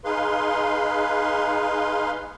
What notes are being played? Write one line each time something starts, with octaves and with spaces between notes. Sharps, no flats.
D#4 G#4 B4 F5 C6